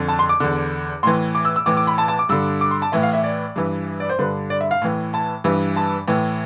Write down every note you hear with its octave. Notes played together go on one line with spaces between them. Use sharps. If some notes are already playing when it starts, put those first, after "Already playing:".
Already playing: F2 D3
A5
C6
D6
E2 D3
A2 E3 C6
D6
E6
E6
A2 E3 D6
D6
B5
A5
A5
D6
G2 D3 E6
D6
C6
A5
A2 E3 E5
F5
E5
D5
G2 E3
D5
C5
G2 D3 B4
D5
E5
F5
A2 E3
A5
G2 E3
A5
A2 E3